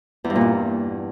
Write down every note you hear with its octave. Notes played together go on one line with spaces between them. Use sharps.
E2
G2
A#2
E2